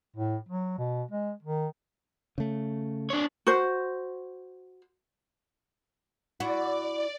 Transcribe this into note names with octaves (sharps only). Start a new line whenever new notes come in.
A2
F#3
B2
G#3
D#3
C#3 A3
D4 C#5
F#4 C5
E4 F#4 D5